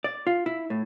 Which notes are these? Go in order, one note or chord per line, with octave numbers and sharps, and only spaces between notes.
D5
F4
E4
A2